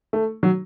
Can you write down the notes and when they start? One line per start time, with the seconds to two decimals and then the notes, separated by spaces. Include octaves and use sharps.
0.13 A3
0.43 F#3